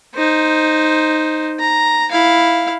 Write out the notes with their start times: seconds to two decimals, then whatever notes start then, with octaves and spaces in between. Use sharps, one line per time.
0.16 D#4 C5
1.60 A#5
2.11 E4 F5